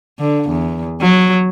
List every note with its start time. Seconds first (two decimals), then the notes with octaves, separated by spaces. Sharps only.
0.19 D3
0.50 E2
1.01 F#3